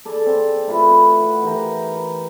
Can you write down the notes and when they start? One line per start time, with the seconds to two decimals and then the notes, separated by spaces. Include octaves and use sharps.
0.05 G#4 A4 D5
0.26 C4
0.67 A3 E4 F4 B4
1.20 F#5
1.43 E3 G4 A#4
1.96 C#6